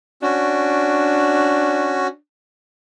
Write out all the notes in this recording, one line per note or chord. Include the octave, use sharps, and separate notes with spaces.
C#4 D4 F#4